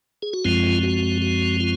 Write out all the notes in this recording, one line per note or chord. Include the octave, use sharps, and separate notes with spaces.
G#4
F#4
F#2 F3 G#3 C4 F4
F#4
F#4
F4